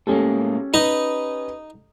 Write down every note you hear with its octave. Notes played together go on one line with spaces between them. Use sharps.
A2 G#3 A#3 C#4 G4 A4
D#4 B4 D#5